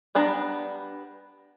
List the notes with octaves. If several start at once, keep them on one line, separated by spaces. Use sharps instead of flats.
G3 B3 D4 A#5 B5